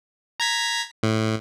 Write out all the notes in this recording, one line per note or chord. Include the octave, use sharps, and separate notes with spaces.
A#5 G#6 B6
A2